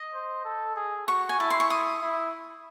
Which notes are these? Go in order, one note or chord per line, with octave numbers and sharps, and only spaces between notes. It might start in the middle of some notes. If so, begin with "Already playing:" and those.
Already playing: D#5
C5
A4
G#4
F#4 C#6
G#5
E4 A5
C6
C#6
D#6
E4